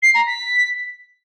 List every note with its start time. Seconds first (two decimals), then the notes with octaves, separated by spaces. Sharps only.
0.03 C7
0.15 A#5
0.27 B6